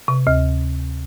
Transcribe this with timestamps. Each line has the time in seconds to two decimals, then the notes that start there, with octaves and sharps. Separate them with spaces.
0.08 C3
0.27 D2